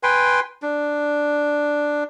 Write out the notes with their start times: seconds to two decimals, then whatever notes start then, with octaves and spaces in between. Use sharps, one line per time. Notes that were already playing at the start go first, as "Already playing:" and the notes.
0.03 B4 G5 G#5 C6
0.62 D4